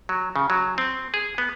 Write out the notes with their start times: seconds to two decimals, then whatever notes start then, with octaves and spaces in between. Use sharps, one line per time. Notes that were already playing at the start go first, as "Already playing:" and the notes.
0.09 F#3
0.36 C#3
0.50 F#3
0.78 C4
1.14 G#4
1.38 B3